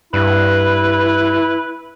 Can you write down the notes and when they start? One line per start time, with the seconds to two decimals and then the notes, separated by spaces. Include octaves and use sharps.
0.13 G2 E4 B4